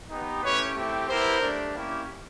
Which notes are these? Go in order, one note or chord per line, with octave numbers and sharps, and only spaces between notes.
B3 D#4 G4
A3 C#4 E4 G4 B4 C#5
A3 C4 E4 G4
B3 E4 G4 A#4 C5
A3 D4 G4
A#3 C#4 E4 G4